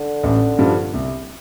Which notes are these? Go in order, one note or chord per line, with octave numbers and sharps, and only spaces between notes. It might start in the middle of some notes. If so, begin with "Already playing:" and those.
Already playing: D3
A1
G2 F3
C2